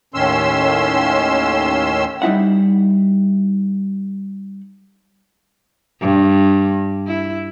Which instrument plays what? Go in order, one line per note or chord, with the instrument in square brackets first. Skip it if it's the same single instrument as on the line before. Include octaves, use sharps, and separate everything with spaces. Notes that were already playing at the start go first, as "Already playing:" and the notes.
[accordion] D#2 A2 D#3 C#4 C6 E6
[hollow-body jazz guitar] G3 D#4 E4 F#5
[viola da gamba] G2
E4